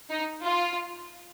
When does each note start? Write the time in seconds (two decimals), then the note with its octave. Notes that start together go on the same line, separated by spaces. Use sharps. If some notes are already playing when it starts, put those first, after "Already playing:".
0.10 D#4
0.44 F4